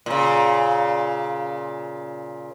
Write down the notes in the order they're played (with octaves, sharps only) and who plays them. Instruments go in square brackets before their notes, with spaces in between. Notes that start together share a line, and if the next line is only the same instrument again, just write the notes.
[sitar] A#2 C#3